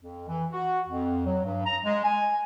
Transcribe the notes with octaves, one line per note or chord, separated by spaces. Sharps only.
F2
E3
F#4
F2
F#3
G2
A#5
G#3
G#5